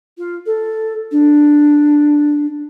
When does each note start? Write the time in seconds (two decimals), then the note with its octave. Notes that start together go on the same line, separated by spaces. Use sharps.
0.18 F4
0.46 A4
1.11 D4